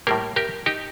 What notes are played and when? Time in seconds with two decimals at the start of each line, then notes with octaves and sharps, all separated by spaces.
0.07 A2 G3 A#3 G4 A#4
0.36 G4 A#4
0.66 D#4 G4